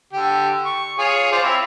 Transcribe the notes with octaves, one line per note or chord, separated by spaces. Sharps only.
D3 G4
C#6
F4 G#4 C#5
F4 C5 D5
C4 E4 E5